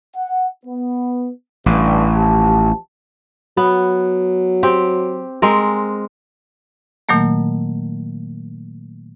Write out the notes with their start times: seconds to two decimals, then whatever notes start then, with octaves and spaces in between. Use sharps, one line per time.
0.15 F#5
0.65 B3
1.66 A1 G2
2.14 F3 G4 A5
3.57 F#3 B3
4.63 C4 G4
5.42 G#3 C4 A#4
7.09 A#2 D#3 F#3 A3 A#3